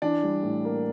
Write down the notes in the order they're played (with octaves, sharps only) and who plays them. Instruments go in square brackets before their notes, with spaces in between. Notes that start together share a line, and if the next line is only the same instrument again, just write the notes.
[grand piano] E3 [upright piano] D4
[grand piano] G3
A2
A#3